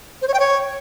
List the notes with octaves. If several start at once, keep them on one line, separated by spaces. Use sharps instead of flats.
C5
C#5
G5
C#5